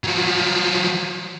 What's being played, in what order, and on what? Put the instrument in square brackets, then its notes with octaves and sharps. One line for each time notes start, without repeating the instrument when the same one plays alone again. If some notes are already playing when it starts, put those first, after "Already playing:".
[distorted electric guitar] F3 F#3